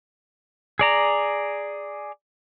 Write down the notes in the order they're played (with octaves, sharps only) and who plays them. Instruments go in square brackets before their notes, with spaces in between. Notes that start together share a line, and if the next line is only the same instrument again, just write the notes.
[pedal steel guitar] G#4 D5 A#5